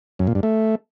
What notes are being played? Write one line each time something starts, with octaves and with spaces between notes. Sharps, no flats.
F#2
A#2
G2
A3